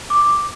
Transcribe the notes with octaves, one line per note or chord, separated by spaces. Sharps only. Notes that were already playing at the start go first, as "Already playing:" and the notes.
D6